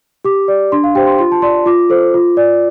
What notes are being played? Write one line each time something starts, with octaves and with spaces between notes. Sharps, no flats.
G4 D6
D5
D4 C6
F5
G4 C5 G5
C6
F4 C6
A5
D5 C6
F4 D6
A4 C5
F4
D5